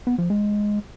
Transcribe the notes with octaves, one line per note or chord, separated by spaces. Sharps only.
B3
F3
G#3